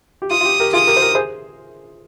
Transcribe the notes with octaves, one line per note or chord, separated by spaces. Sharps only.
G4
F4 D#6
F4
G4
G4 A#4
F4 G#4 D#6
G4 A#4
C5
G4 A#4
G#4 C5